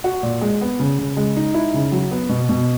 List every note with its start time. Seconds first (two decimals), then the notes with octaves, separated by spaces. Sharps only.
0.04 F#4
0.23 A#2
0.41 G#3
0.61 B3
0.80 C#3
0.99 C#3
1.17 G#3
1.36 D#4
1.54 E4
1.74 C#3
1.92 F#3
2.11 B3
2.29 B2
2.49 B2